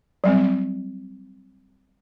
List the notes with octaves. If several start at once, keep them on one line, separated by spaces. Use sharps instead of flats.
F#3 G3 C4